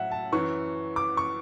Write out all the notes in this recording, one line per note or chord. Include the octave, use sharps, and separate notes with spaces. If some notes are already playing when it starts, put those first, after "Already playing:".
Already playing: A2 F#3 E5 F#5
A5
F#2 E3 C#6
D6
C#6